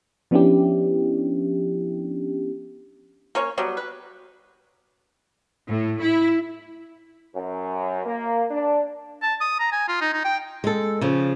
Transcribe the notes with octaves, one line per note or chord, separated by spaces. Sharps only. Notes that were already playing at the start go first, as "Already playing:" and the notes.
F3 B3 C#4 D4 E4 G4
A#3 C#4 C#5
F#3 G3 B3
B4
A2
E4
F#2
A#3
D4
A5
D#6
A#5
G#5
F4
D#4
D#4
G5
G#3 A4
C#3 F3